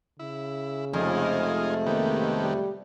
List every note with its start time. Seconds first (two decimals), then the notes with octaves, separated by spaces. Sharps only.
0.19 C#3 E4
0.93 F2 C3 G#3 A3 D#4 F4 G#4
1.86 D#3 A#3 B3 G4
2.41 G3